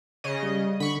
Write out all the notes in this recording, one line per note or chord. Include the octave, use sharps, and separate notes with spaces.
C#3 D#5
G3
D3 B5 C#6